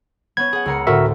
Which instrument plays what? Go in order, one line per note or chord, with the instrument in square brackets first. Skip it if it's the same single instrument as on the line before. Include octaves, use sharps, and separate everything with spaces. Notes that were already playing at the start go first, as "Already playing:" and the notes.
[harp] B3 C#4 [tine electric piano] G#6
[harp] G#4 F#5
C#2 A#4 C#7
[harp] D2 A2 [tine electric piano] F#4 A#4 E5